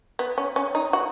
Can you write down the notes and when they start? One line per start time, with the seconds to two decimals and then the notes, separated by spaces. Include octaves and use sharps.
0.19 B3
0.38 C#4
0.56 C#4
0.75 D#4
0.93 F#4